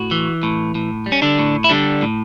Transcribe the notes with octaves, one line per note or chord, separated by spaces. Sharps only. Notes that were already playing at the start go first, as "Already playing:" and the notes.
Already playing: A2 F#4
E3
A2
A2
G3
C#4
D3 D4
A2
E4
D3 G3 D4
A2